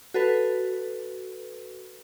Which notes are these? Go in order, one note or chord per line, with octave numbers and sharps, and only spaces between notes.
F#4 A4 B4